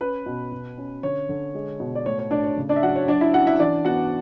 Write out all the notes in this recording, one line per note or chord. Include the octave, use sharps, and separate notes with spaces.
C#4 B4
B2
B2
C#4
D3 C#5
D3
G#3
B2
D5
A2 C#5
C#5
A2 D4 D5
C#5
C#3
D4 D5
E5
F#3 F#4 F#5
C#5
F#3 D4 D5
E4 E5
C#4 F#4 F#5
E4 E5
E3 D4 D5
B3 F#4 F#5